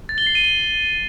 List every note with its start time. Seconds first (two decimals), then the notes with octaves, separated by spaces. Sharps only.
0.09 A6
0.18 G7
0.27 C7
0.35 D#7
0.44 G7